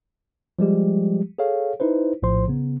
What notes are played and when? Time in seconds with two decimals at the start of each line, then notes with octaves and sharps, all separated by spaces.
0.59 F3 G3 G#3 G4
1.38 G#4 A4 C#5 F5
1.80 D#4 E4 B4 C5
2.22 A#1 A2 F3 C5 C6
2.48 C#3 B3